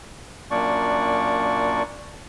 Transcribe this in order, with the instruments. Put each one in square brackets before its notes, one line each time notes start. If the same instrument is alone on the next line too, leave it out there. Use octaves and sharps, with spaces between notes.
[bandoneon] F#2 A#2 A#3 D4 D5 C#6